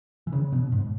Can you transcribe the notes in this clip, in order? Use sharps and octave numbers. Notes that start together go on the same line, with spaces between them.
E3
C#3
B2
G#2